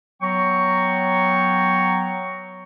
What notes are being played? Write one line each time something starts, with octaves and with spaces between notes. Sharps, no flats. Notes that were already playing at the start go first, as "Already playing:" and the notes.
F#3 B3 G5 A#5 C#6